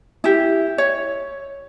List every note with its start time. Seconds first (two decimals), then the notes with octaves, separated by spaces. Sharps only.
0.24 E4 G4
0.78 C#5